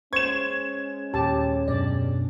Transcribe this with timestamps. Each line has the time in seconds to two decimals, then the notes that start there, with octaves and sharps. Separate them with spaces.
0.13 G#3 C#4 C5 C#6 G#6 E7
1.13 D#2 A#2 G4 A5
1.68 F#2 B2 D4 D5